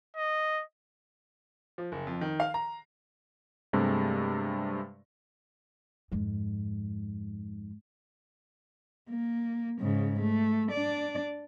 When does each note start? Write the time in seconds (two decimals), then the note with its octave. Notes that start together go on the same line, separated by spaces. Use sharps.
0.16 D#5
1.78 F3
1.92 F#1
2.07 F2
2.21 D#3
2.40 F5
2.54 A#5
3.73 G2 C3 G#3 A3
6.12 F2 G#2
9.10 A#3
9.80 G#2 C#3
10.20 A3
10.71 D4 D5